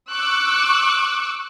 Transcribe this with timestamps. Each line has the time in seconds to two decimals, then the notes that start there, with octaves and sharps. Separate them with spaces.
0.13 C#6 D6 E6 F#6